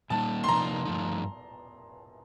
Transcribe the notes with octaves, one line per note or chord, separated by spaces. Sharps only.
A#2 G3 A#3 D#4 A5
C6
C3 F3 A#3 D#4 A#5
G2 F3 A3 D#4